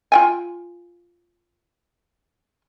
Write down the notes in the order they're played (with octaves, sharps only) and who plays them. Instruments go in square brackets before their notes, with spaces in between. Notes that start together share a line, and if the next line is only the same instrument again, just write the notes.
[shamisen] F4 G5 G#5